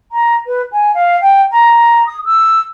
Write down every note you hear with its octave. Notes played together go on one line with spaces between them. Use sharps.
A#5
B4
G#5
F5
G5
A#5
D#6
E6